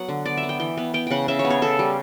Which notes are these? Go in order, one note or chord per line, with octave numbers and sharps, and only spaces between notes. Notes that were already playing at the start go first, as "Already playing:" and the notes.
Already playing: F#3 B3 F#5
D3
B3 D5
E5
B3
G5
E3 G5
B3
B3 G5
C#3 F#5 G5
C#3 E5
C#5
B3
C#5
C#3 A4
G3